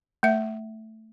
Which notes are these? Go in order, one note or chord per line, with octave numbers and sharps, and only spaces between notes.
A3 E5